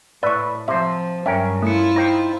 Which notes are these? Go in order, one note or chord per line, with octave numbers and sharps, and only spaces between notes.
A2 B4 D5 E5 C#6
C3 F3 C5 E5
G2 F#3 C#4 A#4 E5 G5
A3 E4 F4 C#7
D#4 C5 G5 A#6